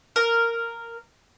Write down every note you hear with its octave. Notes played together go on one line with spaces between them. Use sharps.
A#4